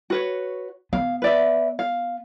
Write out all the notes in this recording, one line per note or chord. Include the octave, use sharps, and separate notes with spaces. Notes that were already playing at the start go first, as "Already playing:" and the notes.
F#4 B4 C#5
B3 F5
B4 D5 E5
F5